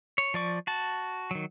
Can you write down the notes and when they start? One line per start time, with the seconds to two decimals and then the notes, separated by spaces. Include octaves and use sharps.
0.18 C#5
0.34 F3 D5 C#6
0.67 F#4 A5
1.31 D#3 F#3